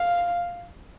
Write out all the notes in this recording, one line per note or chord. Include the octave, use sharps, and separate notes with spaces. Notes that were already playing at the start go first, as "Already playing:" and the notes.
Already playing: F5